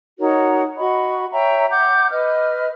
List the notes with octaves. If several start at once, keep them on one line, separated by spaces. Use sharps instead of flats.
D#4 F#4 A#4 C#5
F#4 D#5 B5 C#6
C#5 E5 G5 A#5
F#5 D6 G6
B4 D#5 F6